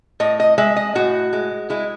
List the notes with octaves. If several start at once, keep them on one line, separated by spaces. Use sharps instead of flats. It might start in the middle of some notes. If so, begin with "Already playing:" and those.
A2 D#5
D#5
G#3 E5
D#5
A2 F#4
G#3
G#3 E4